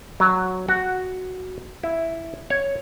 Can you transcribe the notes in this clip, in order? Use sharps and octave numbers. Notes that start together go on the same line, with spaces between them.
F#3
F#4
E4
C#5